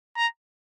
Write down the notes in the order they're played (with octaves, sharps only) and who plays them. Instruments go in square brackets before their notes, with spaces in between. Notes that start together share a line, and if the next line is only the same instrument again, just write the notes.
[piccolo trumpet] A#5